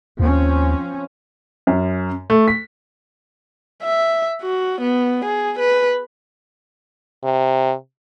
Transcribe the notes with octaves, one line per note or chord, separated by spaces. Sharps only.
D#2 F3 C4 C#4
F#2
A3
B6
E5
F#4
B3
G#4
B4
C3